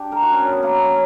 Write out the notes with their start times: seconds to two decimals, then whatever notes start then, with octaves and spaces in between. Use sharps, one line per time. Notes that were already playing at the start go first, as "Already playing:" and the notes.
Already playing: D4 G4
0.12 A#4
0.22 F#4
0.32 C#4
0.42 C#4
0.52 B3
0.63 A#3
0.83 C#4